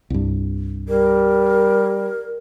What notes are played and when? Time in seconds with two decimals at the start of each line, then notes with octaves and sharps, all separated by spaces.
0.10 C2 G2
0.89 G3 A#4